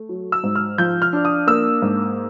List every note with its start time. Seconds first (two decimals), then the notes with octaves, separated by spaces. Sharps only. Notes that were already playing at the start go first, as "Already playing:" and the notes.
Already playing: A3
0.09 F#3
0.32 E6
0.44 G#2
0.55 F6
0.78 F3 G6
1.02 F6
1.13 D4
1.25 D#6
1.47 A#3 E6
1.82 G#2